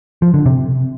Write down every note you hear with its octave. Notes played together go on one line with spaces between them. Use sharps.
F3
D3
C3